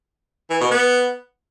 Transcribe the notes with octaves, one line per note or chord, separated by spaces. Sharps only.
E3
B2
B3